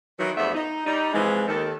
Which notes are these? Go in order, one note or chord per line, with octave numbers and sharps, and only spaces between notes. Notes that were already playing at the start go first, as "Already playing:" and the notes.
D#3 E3 F#3
E2 G2 F3 A3 B3 E5
D#4
G3 D#4
C3 E3 F3 G#3
D#2 D#3 A4